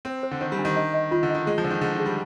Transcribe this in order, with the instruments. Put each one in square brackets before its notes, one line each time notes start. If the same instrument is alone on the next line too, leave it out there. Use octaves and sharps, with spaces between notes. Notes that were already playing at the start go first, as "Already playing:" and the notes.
[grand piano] C4 [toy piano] C5
[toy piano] C5
[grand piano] D3
[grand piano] D#3 [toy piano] C5
[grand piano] G3
[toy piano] D4
[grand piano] D#3
[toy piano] D#5
D#5
[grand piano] D#3 [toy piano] F4
[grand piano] D3
[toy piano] D#5
[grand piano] D#3
[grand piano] G#3 [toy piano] G#4
[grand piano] F3
[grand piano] D3 [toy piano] D5
[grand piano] D#3
[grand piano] D3 [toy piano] G#4
[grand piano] D#3
[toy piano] G#4
[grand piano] G3